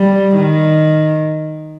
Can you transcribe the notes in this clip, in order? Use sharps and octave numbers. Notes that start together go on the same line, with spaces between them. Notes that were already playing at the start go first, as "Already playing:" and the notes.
Already playing: G3
D#3